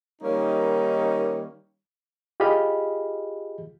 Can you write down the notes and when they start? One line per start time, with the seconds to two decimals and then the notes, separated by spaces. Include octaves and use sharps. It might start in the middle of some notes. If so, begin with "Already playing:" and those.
0.22 D#3 G3 A#3 C#4 D#4
2.40 F4 G4 G#4 D#5 B5 F6